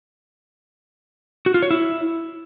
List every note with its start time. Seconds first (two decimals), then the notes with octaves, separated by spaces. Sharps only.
1.46 F#4
1.54 F4
1.62 C#5
1.71 E4